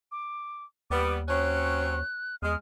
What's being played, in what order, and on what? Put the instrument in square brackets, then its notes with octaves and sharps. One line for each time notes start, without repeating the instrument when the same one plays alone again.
[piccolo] D6
[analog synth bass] D#2 [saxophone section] G3 B3 [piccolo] D6
[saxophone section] F#3 C4 C#4 [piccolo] F#6
[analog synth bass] E2 [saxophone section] G#3 [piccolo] F6